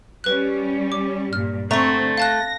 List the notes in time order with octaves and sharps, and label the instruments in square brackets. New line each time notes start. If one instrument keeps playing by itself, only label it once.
[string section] G3 C#4 [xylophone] B4 F#6
[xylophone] D6
[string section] G2 A#2 [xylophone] F6
[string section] D3 C4 [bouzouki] A3 [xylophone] A#5 C#6
[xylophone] F5 A5 F#6 [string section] A#6